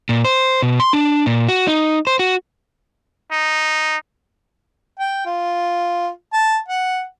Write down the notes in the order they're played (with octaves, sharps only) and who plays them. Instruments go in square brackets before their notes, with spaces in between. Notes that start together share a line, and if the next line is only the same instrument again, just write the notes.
[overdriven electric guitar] A#2
C5
B2
C6
D4
A#2
F#4
D#4
C5
F#4
[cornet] D#4
[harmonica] G5
F4
A5
F#5